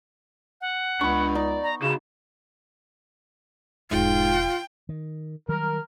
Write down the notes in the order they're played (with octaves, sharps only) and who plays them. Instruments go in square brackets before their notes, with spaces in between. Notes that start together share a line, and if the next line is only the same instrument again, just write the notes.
[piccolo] F#5
[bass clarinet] C#2 [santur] B3 C#6 [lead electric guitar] D4 B5
[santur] D#4 [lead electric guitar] D5
[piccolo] A#5
[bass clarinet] C#3 [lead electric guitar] D#4 F#4 [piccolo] E7
[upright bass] E1 F3 [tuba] G#2 [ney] F4 [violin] G5
[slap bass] D#3
[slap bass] D#3 F#3 G3 [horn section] A#4